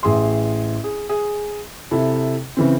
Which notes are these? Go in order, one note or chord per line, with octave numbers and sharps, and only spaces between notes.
A1 G#4 E5 C6
G#4
G#4
C3 E4 A4
C#3 E3 C4